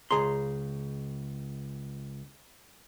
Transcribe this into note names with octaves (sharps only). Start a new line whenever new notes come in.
C#2 G#4 A#5 C6